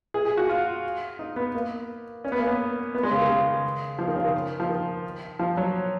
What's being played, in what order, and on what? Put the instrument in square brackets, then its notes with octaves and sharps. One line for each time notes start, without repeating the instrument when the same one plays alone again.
[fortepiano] G#4
G#4
F#4
F4
D#4
B3
A#3
C#4
B3
A#3
B3
B3
G#3
C#3
D#3
C#3
F3
D#3
C#3
D#3
F3
D#3
F3
F#3